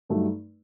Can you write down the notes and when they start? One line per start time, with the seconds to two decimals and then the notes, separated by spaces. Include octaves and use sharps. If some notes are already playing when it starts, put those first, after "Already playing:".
0.09 G2 F#3 A3 D#4